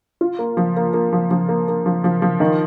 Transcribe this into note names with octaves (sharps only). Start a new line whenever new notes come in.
F4
A#3
F3
A#3
A#3
F3
F3
A#3
A#3
F3
F3
F3
D#3